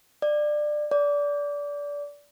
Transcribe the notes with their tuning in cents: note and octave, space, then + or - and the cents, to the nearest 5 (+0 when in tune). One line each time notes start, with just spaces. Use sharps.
D5 +20
D5 -25